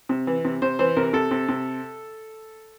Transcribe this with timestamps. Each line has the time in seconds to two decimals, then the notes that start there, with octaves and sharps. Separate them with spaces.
0.09 C3
0.27 E3
0.45 C3
0.62 C3 C5
0.79 E3 C5
0.97 C3 A#4
1.13 C3 A4
1.31 C3
1.49 C3